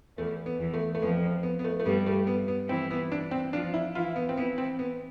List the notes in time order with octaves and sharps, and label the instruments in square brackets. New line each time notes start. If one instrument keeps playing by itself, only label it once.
[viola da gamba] E2 E3 [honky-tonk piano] A3
[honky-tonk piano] B3
[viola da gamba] E2 E3
[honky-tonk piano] A3
A3
[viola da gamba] F2 F3 [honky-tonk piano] B3
[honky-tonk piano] B3
B3
A3
A3
[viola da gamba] G2 G3 [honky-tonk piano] B3
[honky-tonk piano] A3
B3
B3
[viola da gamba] E3 E4 [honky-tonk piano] C4
[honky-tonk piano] B3
D4
C4
[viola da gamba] F3 F4 [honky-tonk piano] D4
[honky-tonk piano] E4
[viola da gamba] E3 E4 [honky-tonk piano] F4
[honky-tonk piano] B3
C4
[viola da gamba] E3 E4 [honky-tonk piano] B3
[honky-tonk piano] C4
B3